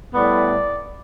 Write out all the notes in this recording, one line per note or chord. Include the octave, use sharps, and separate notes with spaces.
A2 G3 B3 E4 D5